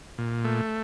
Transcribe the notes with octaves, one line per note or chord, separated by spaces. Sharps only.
A#2
A3